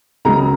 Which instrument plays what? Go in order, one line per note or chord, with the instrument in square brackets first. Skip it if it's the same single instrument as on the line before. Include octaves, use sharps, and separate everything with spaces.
[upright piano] C#2 C#3 F#3 A#5